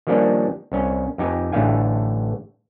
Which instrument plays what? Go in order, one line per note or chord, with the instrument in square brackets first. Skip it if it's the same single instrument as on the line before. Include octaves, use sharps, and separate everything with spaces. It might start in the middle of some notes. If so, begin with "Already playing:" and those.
[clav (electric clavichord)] D#3 F3 G3 A#3 C#4 D4
C2 C#4
F2 D#4 G4 G#5
A1 A2 D3 A3 F5 G#5